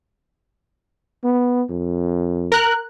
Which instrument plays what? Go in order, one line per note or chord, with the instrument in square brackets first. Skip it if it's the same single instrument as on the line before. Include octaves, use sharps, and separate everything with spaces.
[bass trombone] B3
F2
[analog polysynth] A#4 F#6